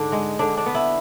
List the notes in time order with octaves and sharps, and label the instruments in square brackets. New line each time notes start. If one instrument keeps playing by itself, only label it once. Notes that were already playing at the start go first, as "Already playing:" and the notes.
Already playing: [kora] G#2 D3 D4
G#3
D3 D4
D4
B3
E4